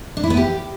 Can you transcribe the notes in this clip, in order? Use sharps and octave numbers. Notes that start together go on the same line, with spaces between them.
D4
E4
B3
G4